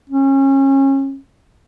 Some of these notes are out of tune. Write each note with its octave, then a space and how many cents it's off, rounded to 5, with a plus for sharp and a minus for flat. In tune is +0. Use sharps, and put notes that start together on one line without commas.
C#4 -30